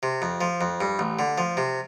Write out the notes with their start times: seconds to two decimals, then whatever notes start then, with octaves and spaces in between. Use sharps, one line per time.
0.03 C3
0.22 F2
0.41 F3
0.61 F2
0.81 G2
0.99 A1
1.19 D3
1.38 F3
1.57 C3